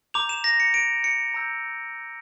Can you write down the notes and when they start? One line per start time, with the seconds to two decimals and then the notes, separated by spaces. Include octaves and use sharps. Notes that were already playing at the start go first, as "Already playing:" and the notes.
0.14 A#5 D6 G6 F7
0.29 E7
0.44 A#6
0.60 C#7
0.74 D7
1.04 C#7
1.34 A#5 E6 G6